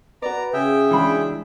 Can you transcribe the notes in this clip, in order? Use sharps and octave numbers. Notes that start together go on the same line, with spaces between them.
F#4 B4 D5 A#5
C#3 G#4 E5 G5
E3 G#3 D4 F4 F#4 B5